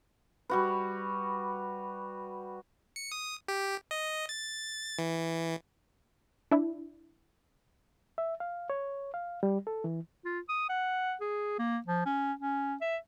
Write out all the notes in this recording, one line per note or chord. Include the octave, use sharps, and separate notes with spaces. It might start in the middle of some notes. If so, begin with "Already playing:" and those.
G3 F#4 B4
C#7
D#6
G4
D#5
A6
E3
D4 E4
E5
F5
C#5
F5
G3
A4
E3
F4
D#6
F#5
G#4
A#3
F3
C#4
C#4
E5